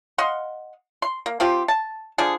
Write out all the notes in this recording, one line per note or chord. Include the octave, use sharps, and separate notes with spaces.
D#5 F5 F#5 C6
C6
A#3
F3 C4 F4 G4
A5
D3 F3 D4 G#4